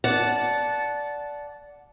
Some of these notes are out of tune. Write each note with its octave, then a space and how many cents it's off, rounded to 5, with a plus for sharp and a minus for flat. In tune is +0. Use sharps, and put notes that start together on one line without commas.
D5 -10 F#5 +0 A5 -15